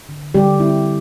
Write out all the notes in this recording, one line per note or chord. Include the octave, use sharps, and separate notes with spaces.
D3
D3 G3 G4
C4 E4